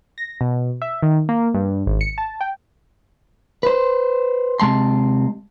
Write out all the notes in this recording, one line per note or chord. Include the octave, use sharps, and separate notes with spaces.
A#6
B2
E5
D#3
A#3
G2
G#1
C#7
A5
G5
B4 C5
C3 G#3 A5 C6